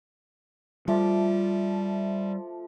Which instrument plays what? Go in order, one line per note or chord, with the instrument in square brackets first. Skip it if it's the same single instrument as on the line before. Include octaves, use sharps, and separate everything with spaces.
[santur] F3 A3 D6 [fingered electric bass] G3